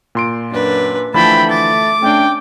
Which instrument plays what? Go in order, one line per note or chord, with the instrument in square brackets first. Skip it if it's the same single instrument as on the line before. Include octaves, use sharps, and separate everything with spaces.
[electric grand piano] A#2 C6 D7
[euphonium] F#2 [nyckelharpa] D4 B4
[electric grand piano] D3 E3 F3 [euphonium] A3 [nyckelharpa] G5 A5 [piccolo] B5
[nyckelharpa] D6 [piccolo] A6
[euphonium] A3 [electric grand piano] C#4 D4 [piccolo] G5